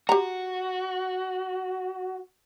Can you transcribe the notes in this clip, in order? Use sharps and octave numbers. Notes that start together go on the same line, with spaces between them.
F#4 G4 A#5